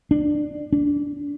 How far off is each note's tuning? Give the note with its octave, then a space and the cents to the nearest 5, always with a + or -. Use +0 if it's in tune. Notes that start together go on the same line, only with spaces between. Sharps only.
D4 +15
D4 -25